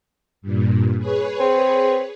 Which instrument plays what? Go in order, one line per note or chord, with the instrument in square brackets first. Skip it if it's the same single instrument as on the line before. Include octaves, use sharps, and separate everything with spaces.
[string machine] G2 A#2
G#4 B4 C#5
[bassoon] C4